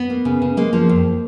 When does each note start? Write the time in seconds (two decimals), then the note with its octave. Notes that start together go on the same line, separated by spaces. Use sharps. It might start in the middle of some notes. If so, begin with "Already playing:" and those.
Already playing: B3
0.10 A#3
0.25 C#3
0.42 C#3
0.57 G#3 A#3
0.73 F3
0.89 F2